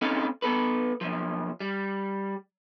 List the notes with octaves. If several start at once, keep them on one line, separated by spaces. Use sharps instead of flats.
C4 C#4 D#4 A4 F5
B3 A4 B4
B1 F3
G3